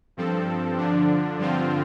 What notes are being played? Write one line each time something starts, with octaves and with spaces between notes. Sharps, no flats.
G2 F3 C4 A4
D3 F3 D4
G2 D3 F3 C4 F4